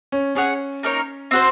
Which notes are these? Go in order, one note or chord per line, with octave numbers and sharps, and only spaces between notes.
C#4
C#4 G#4 C#5 F#5
A#3 D#4 A#4 C#5
C4 F#4 C5